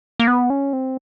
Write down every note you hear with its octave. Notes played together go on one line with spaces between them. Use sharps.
A#3
B3
C#4
C4